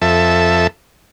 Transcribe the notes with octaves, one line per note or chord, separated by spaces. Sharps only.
F2 A4 E5